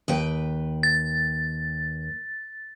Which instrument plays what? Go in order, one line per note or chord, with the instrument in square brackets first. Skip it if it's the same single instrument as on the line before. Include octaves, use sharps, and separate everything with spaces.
[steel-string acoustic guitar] D#2 B4 G5
[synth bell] A6